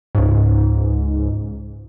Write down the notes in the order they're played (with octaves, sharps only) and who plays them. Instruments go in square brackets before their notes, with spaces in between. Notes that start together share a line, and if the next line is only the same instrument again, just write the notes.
[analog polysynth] C#2 G#2